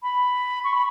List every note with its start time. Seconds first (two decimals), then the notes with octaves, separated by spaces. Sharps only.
0.02 B5
0.64 C#6
0.73 B5